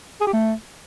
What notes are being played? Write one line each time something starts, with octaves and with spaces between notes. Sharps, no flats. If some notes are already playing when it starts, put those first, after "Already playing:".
G#4
G4
A3